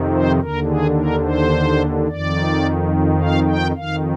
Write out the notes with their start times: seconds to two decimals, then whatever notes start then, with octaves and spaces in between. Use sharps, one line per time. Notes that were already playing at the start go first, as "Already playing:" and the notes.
Already playing: F2 C3 D#3
0.12 C5
0.40 D#2 D3 A#4
0.67 G#4
0.96 A#4
1.23 C5
2.08 F2 D#3 D5
3.20 F5
3.48 G5
3.76 F2 D#3 F5